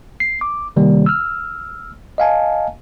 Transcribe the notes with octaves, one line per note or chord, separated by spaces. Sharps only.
C7
D6
C3 D#3 G3 A#3
E6 F6
D#5 F5 G#5 A5